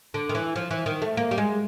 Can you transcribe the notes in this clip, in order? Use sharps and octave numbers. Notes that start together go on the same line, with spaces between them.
D3
D#3
E3
F3
E3
D#3
A3
A#3
G3
G#3